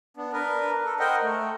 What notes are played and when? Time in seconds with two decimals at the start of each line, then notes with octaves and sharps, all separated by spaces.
0.17 B3 D4
0.33 D4 A#4 B4
0.85 A4
1.00 A#4 C5 D#5 F#5 G5
1.22 A3